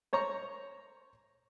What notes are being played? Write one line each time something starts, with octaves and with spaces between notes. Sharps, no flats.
C5 C#5 A#5 C#6